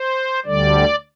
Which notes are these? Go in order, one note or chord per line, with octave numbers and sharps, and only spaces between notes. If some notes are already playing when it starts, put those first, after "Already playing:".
Already playing: C5
D2 D3 G3 D5